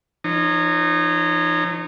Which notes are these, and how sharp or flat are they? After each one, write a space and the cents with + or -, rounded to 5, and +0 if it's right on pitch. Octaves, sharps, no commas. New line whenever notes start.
F3 -45 D#4 -25 C#5 +0